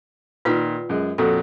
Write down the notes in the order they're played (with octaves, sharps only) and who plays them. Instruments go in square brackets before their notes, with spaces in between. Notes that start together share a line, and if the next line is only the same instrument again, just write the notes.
[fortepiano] A#2 D#3 [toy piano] F4 B4 F#5
[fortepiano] F#2 G#3
[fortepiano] F2 A#2 F#4 [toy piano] A4